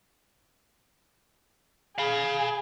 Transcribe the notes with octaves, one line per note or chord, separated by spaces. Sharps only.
G#4 F5 B5